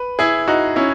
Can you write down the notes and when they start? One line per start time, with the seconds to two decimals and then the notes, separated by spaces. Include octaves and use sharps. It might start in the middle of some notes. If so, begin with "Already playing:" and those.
Already playing: B4
0.19 E4 G#4
0.48 D#4 F#4
0.76 C#4 E4